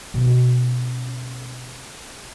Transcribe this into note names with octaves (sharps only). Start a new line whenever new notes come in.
B2 C#4